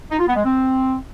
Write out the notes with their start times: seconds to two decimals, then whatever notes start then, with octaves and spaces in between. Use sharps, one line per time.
0.10 D#4
0.19 F4
0.27 B3
0.36 G#3
0.44 C4